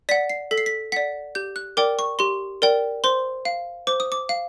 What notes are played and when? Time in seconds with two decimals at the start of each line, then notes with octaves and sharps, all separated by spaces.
0.09 D5 F#5 B6
0.30 C7
0.51 A4 B6
0.58 C7
0.66 B6
0.92 D5 F#5 B6
1.35 G4 G6
1.56 F#6
1.77 A#4 D5 G5 D6
1.99 C#6
2.19 G4 C6
2.62 A#4 D5 G5
3.04 C5 C6
3.45 F5
3.87 C5 D6
4.00 D#6
4.12 D6
4.29 F5